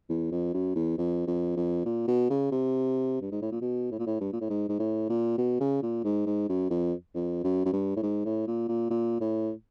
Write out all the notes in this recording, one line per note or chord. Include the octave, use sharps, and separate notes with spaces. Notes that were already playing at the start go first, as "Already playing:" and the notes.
E2
F2
F#2
E2
F2
F2
F2
A#2
B2
C#3
C3
G2
G#2
A2
A#2
B2
A2
A#2
A2
G2
A#2
A2
G#2
G#2
A2
A#2
B2
C#3
A#2
G#2
G#2
F#2
F2
F2
F#2
F#2
G2
A2
G#2
A2
A#2
A#2
A#2
A2